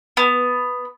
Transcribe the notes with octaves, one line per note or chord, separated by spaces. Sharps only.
B3